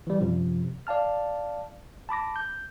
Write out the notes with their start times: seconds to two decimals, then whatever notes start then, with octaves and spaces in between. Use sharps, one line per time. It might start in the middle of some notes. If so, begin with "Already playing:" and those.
0.07 E3 G3
0.21 F#2 C3 F3
0.87 D5 F5 A5 F6
2.09 A5 B5 D6 A#6
2.36 G6